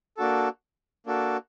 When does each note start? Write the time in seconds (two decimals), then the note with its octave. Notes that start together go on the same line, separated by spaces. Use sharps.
0.17 A#3 D4 F#4 A4
1.06 A#3 D4 F#4 A4